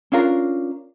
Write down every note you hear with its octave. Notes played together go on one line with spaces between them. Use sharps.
C#4 D4 F4 A#4